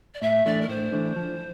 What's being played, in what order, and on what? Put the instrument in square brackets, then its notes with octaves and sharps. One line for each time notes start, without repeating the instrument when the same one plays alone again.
[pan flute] D5
[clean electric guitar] A2 [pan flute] E5
[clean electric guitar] E3 A3 D4 [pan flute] D5
[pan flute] A#4
[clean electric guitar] A2 [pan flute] C5
[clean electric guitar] E3 A3 D4
F3